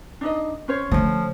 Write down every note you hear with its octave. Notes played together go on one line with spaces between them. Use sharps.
D4 D#4 D#5
C#4 C5 C#5
D3 F3 A3